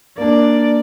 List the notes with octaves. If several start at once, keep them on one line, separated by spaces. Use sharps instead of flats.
A#3 D4 D5